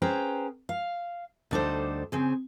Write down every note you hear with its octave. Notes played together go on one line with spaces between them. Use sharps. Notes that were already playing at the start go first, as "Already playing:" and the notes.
C#4 G#4 B4 C5 G5 A#5
F5
D2 G3 D4 D#4 A4 C5
C#3 C4 G#4